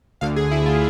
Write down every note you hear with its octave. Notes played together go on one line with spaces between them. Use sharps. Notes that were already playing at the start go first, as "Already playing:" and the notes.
D2 D3 F5
G#4
E4
F4